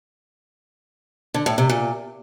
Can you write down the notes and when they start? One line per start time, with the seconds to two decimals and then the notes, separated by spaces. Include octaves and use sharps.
1.34 D3
1.46 A2
1.58 C3
1.70 A#2